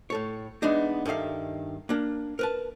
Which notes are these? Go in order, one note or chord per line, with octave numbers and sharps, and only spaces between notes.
A2 A4 C#5
E3 G#3 B3 D4 D#4
G2 D#3 A4 E5 F5
A#3 D4 A#4
A#4 B4 A5